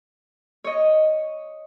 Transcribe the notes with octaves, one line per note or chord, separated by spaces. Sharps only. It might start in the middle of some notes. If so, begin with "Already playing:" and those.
C#5 D#5